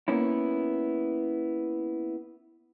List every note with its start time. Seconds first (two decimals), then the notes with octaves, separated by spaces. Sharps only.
0.08 A#3 B3 C#4 E4